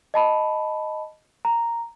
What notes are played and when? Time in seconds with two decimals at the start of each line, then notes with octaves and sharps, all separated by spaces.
0.14 D#5 A5 B5
1.45 A#5